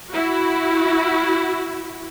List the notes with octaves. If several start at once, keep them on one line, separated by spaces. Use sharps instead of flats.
E4 F#4